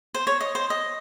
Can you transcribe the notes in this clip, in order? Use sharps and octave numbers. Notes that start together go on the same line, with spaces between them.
C5
C#5
D#5
C5
D#5